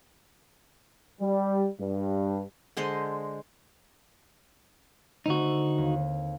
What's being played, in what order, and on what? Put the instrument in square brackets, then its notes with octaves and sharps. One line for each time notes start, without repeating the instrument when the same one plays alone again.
[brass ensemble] G3
G2
[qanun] D3 G#3 C5 D#5
[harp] D3 A3 C4 [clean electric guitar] D#4 F#4
[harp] D#2